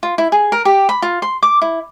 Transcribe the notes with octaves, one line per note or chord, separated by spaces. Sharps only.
F4
E4
G#4
A#4
G4
B5
F4
C6
D6
E4